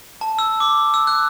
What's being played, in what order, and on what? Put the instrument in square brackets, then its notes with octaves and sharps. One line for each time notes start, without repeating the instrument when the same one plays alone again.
[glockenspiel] A5
E6
D6
E6
F#6